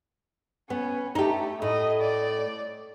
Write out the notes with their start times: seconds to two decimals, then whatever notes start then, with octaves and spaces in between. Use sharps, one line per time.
0.70 B3 C#4
1.15 A3 D#4 G4
1.62 A2 D#5
2.01 D5